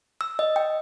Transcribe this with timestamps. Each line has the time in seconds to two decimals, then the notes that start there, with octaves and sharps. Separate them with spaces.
0.21 E6
0.39 D#5
0.56 G5